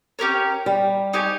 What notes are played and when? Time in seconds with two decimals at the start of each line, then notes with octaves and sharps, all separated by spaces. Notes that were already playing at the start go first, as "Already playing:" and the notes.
0.19 C#4 G4 A#4 C#5
0.66 G3
1.13 D#4 G4 C#5 G#5